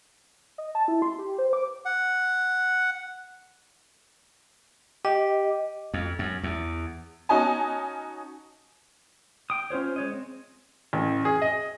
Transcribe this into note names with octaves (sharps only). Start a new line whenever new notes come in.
D#5
A5
E4
C6
G4
C5
D6
F#5
G4 D#5
F2
F#2
E2
C#4 D#4 F#4 D#5 G#5 A5
G5 D#6
C#4 F4 C5 C#5
G#3 C#5 D#5
C4
A1
G#4
D#5